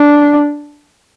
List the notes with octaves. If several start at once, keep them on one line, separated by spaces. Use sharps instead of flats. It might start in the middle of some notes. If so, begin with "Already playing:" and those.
Already playing: D4